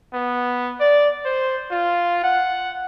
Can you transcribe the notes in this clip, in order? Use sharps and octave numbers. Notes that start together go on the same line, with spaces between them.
B3
D5
C5
F4
F#5